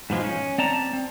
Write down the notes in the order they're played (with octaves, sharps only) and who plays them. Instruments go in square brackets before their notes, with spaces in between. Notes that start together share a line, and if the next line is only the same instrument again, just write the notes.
[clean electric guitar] G#2 B2 F3 G#3
C#4
C4 D5 A5 A#5
C4